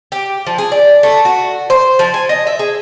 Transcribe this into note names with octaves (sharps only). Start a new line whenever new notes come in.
G4
F3
G#4
D5
A3
F#4
C5
F3
G#5
D#5
E5
G#4